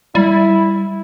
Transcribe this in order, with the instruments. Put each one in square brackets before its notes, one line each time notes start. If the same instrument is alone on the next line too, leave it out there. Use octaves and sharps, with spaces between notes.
[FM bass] G3 [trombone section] E4